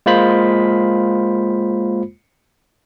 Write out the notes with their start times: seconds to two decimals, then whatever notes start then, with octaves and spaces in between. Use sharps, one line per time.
0.06 G#3 A#3 F4 C5 B5 B6